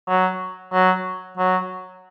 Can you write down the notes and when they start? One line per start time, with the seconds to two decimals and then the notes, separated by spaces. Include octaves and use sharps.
0.08 F#3
0.73 F#3
1.37 F#3